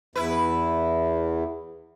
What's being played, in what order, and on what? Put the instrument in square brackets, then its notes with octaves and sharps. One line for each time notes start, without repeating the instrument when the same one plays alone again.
[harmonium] E2 [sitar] E4 B4